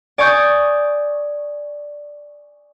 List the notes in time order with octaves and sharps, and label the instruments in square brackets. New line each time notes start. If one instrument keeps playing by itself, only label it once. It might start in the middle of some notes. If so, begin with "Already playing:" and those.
[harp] D5 G#5 C#6 D#6 G6